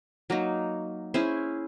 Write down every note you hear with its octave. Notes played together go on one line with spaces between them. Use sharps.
F#3 A#3 D#4
C#4 E4 G#4 C5